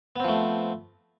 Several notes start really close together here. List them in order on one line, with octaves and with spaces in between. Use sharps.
B3 C4 F3 A3